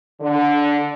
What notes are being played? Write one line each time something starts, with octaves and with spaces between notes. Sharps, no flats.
D3